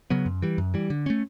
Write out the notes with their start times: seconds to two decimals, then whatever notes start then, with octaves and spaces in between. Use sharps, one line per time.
0.10 C#3 F#3 B3
0.26 F#2
0.42 E3 G3
0.58 F#2
0.74 E3 G3
0.90 D3
1.06 A3 C#4